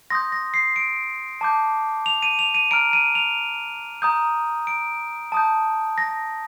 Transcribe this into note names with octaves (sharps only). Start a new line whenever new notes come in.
C6 D#6 G6 A#6
A#6
C7
D7
A5 D6 G6
F7
D#7
F7
D#7
A#5 F6 D7
D#7
F7
A#5 D#6 G6
D7
A5 D#6 G6
A#6